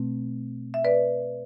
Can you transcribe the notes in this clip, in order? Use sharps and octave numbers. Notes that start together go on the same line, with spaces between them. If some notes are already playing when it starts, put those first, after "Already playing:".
Already playing: B2 A3 C4
E5
B4 D5